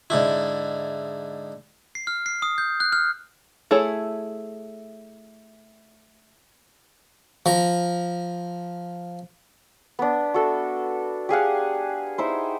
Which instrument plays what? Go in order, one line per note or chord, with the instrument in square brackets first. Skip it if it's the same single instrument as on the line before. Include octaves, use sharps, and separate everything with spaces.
[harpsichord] G#2 D3 E4
[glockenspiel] C7
F6
C7
D#6
G6
F#6
F6
[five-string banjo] A3 E4 G#4 A4 C#5
[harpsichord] F3 A#5
[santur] B3 D4
F#4 A4 E5
G4 G#4 F5 F#5
D#4 E4 C5